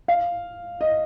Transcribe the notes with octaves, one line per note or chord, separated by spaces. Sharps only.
F5
D#5